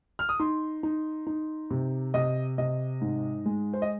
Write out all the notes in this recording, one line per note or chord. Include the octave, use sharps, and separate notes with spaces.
F6
D#6
D#4 C6
D#4
D#4
C3
C3 D#5
C3 D#5
G#2
G#3
C5
D#5